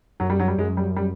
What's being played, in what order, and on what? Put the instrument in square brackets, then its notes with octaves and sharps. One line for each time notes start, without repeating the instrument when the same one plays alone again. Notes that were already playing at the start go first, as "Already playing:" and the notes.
[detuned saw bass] F#2 [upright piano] F#3
[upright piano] G3
F#3
G3
[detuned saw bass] F#2 [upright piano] G#3
[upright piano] G3
G3